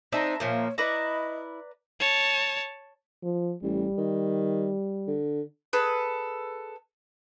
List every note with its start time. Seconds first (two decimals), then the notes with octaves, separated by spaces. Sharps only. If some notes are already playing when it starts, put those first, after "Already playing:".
0.12 C4 D4 D#4 E5 A5 A#5
0.40 A#2 F3 A#3 C#5
0.78 E4 B4 D5 D#5 A#5
2.00 C#5 A5
3.23 F3
3.63 A1 G3
3.98 D#3
5.08 D3
5.73 G#4 A4 B4